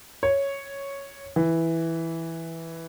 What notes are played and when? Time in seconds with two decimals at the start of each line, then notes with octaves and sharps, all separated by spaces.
0.23 C#5
1.36 E3